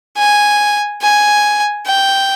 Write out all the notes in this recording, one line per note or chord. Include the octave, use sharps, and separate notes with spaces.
G#5
G#5
G5